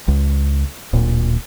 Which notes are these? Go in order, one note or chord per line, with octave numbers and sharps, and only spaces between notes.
C#2
D1 A#2